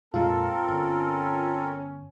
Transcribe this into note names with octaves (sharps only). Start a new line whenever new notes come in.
F2 A#2 G#3 C4 F4 A4 A#4 A5
G1 C#4